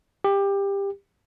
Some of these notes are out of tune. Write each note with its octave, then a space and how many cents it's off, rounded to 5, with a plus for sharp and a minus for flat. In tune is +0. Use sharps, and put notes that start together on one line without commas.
G4 +20